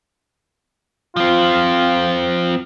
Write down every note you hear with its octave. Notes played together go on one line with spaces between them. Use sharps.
F3 C4 F4